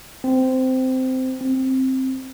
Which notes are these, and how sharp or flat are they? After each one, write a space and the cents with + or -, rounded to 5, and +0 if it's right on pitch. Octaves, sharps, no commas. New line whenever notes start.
C4 -15
C4 +5